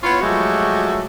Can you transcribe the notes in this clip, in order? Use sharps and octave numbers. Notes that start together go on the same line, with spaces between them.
B3 E4 F4 C#5
F3 F#3 G#3 A3 F#4 G4